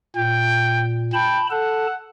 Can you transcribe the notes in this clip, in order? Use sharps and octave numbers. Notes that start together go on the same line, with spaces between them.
A#2 G5
G5 A5 B5
A4 F#5 A5